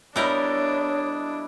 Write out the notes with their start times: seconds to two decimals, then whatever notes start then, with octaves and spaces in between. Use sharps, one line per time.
0.16 G3 B3 D4 E4 A#4 C#5 D#5